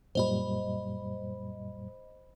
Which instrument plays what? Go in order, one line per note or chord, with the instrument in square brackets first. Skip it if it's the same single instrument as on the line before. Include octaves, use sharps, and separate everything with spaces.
[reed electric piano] F#2 A#2 G3 [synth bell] C5 D#5 B5